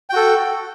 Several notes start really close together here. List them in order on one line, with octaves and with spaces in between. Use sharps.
G5 F#4 A4